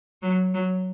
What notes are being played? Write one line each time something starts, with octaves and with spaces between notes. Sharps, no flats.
F#3
F#3